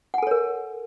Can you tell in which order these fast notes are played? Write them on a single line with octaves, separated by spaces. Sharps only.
F#5 G#5 A4 C#5 A#4